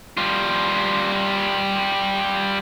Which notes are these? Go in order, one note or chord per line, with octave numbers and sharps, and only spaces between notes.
G3 F4